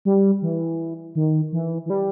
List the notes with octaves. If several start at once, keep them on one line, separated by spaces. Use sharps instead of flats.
G3
E3
D#3
E3
E3
G3